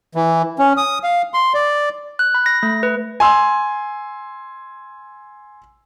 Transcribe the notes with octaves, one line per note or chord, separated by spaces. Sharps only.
E3
C#4
D#6
F5
C6
D5
F#6
B5
A#6
A3
B4
G#5 C6 E6